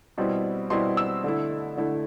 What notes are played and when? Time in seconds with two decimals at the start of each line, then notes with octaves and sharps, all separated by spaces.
0.18 B2 G3 C4 E4
0.70 B2 G3 C4 E4 C6
0.97 E6
1.24 D3 A3 E4
1.77 D3 A3 E4